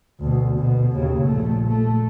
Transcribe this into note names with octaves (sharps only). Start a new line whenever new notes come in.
D2 B2
B2
D#2 C#3
A#1 A3
A3